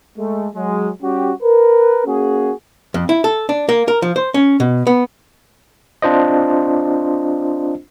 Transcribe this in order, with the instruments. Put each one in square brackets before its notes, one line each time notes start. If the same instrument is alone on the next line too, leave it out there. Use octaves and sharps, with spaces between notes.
[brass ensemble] G#3 A3
F#3 G#3
G3 C#4 F#4 G4
A#4 B4
A#3 C#4 F#4 G#4
[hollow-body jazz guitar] F2
E4
A4
D4
A#3
A#4
F3
C5
C#4
B2
B3
[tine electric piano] C4 D4 F4 C5 D#5